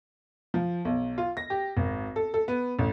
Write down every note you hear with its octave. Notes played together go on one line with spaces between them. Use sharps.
F3
B1
F4
A#6
G4
G#1
A4
A4
B3
A1